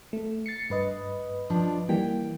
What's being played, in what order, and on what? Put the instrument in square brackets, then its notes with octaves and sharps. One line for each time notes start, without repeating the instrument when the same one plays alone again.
[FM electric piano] A3
A6 C7 C#7
G2 B4 D#5
[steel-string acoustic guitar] F3 D4
[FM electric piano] E3 G3 A#3 [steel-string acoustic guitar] G5